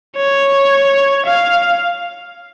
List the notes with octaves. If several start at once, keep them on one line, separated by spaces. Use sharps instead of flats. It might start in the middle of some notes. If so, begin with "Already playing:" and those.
C#5
F5